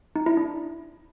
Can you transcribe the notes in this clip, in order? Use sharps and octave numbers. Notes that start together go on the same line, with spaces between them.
D#4
E4
D4